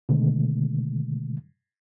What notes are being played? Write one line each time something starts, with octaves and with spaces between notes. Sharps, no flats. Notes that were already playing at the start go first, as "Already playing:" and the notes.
B2 D3 D#3 G#3 A3